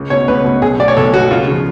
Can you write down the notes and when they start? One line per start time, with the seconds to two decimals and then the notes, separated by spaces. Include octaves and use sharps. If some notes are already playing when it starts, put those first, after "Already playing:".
Already playing: C#2
0.10 B2 C#5
0.28 C#2 B4
0.44 B2
0.62 B1 G#4
0.79 B2 D5
0.88 C#5
0.97 B1 A4
1.13 B2 F#4
1.31 C#2 F4
1.47 C#3 F3